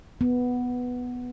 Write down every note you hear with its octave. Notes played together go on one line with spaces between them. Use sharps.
B3